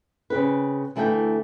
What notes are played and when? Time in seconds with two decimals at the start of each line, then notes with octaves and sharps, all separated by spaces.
0.30 C#3 C4 B4
0.96 D2 E3 A3 E4 G5